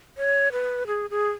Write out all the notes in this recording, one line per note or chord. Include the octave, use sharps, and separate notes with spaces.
C#5
B4
G#4
G#4